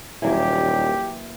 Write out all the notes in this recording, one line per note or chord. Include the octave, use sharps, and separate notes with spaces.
D#1 E3 F#3 A#3 G4